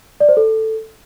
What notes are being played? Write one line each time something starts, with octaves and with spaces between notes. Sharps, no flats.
D5
C5
A4